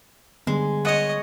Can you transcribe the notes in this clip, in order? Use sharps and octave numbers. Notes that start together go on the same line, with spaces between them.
D3 G3 G#3 B3
C#5 D#5 F#5